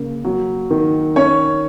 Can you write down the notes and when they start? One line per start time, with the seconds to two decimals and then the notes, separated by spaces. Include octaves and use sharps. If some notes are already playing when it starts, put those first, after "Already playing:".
Already playing: C#3 A#3
0.25 F#3
0.70 D#3
1.16 C#4 C#5